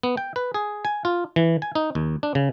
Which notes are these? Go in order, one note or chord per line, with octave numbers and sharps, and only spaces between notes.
B3
G5
B4
G#4
G#5
F4
E3
G#5
D#4
D#2
D4
C#3